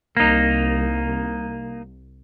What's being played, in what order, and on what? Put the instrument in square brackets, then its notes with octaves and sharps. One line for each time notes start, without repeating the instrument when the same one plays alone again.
[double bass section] C2 [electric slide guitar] A#3 D#4